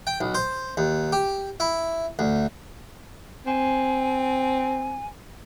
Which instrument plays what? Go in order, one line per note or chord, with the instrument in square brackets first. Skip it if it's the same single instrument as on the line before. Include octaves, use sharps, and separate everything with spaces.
[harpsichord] G5
B1
C5
D#2
G4
E4
D2
[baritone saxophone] C4 [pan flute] G#5